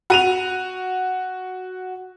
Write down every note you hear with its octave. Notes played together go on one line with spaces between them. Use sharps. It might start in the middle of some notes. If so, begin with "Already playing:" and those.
F#4 D#7 F7